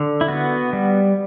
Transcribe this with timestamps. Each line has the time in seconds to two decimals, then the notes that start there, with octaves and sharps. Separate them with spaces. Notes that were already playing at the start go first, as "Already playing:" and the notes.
Already playing: D3
0.21 E4
0.28 B3 F#4
0.73 G3